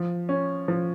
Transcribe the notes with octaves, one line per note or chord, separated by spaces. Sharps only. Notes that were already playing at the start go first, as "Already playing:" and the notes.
Already playing: F3
C#4
F3